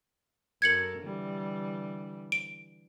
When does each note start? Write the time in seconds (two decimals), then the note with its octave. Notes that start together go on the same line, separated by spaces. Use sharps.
0.62 F#2 A4 A#4 G#6 C#7 F#7
1.01 D3 E3 G3
2.32 D7